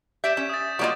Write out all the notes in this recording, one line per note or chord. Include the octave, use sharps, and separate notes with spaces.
G4 D5 E5 G6 B6 E7
C#4 E5
D#6 A6
G3 A#3 F4 F#4 D5 D#5